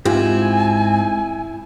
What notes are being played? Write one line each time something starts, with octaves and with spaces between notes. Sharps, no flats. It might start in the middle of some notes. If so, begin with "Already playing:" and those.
G#2 C4 E4 F4 G4 G#5